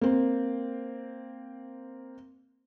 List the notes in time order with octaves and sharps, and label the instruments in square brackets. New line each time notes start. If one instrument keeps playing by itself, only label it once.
[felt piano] A#3 C4